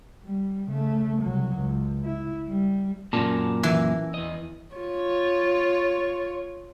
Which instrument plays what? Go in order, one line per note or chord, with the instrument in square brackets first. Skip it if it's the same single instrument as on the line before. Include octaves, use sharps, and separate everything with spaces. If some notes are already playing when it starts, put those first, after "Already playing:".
[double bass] G3
C#3 A3
C2 F#3
C#2
E4
G3
[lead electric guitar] F#2 A#2 [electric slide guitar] C#4 A#4 A5
[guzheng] E3
[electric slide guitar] E2 D#5
[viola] F4 C#5